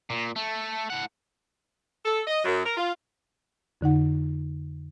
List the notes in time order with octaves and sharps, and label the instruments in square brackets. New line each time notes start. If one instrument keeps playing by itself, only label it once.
[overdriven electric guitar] A#2
A3
A2 F#5
[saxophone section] A4
D#5
F#2
A#4
F4
[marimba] F2 D3 D#4 F#5